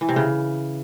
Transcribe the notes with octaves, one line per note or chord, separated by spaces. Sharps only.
E3
C3
C#3